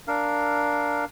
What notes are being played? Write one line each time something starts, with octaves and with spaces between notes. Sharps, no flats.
D4 A#4 F5